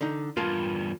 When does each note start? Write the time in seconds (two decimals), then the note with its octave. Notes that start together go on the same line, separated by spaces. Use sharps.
0.01 D3 D#4
0.37 E2 G2 F4 A#4 A5